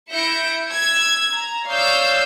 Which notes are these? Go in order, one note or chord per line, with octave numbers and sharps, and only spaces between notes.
E4 E5 G6 A#6 C#7 D7
E6 G#6
A#5
C#5 D5 F5 D#6 E6 G6